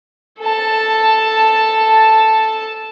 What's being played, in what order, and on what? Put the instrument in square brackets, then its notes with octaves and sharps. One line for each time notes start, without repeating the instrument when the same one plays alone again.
[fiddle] A4 A5